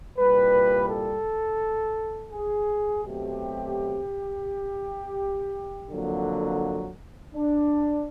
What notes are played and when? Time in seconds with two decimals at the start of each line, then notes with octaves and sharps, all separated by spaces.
0.18 C2 A#2 G3 B4
0.90 A4
2.32 G#4
3.04 B2 F#3 A3 C4 G4
5.91 F2 D3 F#3 A#3
7.34 D4